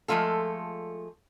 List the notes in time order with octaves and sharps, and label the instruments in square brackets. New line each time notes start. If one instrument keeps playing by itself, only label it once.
[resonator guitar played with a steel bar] F3 G#3 A3 F4 A4